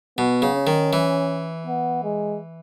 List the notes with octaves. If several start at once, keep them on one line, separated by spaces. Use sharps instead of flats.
B2 B3
C#3
C#4
D#3
E3
B3
G#3